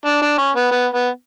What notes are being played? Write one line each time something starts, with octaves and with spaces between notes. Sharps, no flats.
D4
D4
C#4
B3
B3
B3